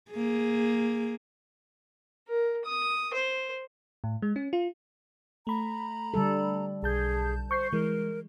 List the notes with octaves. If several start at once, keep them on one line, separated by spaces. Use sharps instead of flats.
A#3 G#4
A#4
D#6
C5
A2
G#3
C#4
F4
A3 A#5 B5
D3 G3 A4
B1 G#4 A5 G6
C5 C#6 G6 C7
E3 G#3 A#4